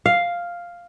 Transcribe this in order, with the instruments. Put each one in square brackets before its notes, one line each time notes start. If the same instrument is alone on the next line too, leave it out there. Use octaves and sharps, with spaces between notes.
[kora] F5